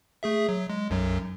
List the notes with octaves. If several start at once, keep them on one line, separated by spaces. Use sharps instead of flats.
A3 G#4 E5
F#3
G#3
B1 F#2 F#3